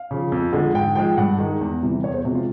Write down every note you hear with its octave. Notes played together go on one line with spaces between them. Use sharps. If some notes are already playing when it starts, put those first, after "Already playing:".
Already playing: F5
C#3 F3
F2
D3 F3 G#3
G#2 G5
F3 G#3 G5
G2 F#5
D#3 G#3
E2
C3 E3 G3
E2 C#5
C5
C3 F3 G#3 F#4
F4